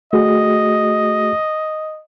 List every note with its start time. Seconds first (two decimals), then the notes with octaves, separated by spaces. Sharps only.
0.13 A3 F#4 G#4 D#5